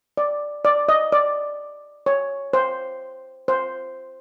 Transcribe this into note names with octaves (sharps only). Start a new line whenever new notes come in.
D5
D5
D#5
D5
C#5
C5
C5